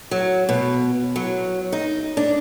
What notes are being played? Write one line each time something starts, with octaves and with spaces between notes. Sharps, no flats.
F#3
B2
F#3
D#4
D4